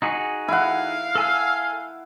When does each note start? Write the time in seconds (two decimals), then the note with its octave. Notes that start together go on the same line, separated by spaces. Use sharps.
0.02 D#4 F#4 G#4
0.48 E4 F5 F#5
1.15 A4 G#5 E6